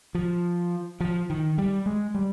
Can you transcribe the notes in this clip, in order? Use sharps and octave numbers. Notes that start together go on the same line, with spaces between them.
F3
F3
D#3
G3
G#3
G3